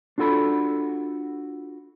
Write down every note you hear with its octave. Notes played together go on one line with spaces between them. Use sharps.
D4 F4 F#4 A4 B5